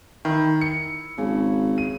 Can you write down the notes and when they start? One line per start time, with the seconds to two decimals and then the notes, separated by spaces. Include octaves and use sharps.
0.25 D#3 E4
0.61 C#7
1.18 G#1 C#3
1.78 D#7